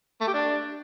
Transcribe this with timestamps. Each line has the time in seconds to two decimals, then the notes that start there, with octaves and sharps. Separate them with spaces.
0.21 A3
0.27 G4
0.34 D4